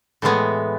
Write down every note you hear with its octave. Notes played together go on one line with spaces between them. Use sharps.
A2 E3 G#3 B3